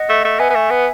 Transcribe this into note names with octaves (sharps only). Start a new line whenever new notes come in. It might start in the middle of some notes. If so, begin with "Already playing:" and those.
Already playing: D#5 F#5
A3
A3
B3 E5 G#5
B3
A3
B3